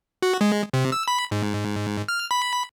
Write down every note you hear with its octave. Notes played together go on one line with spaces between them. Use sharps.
F#4
G#3
C3
E6
B5
G#2
F6
B5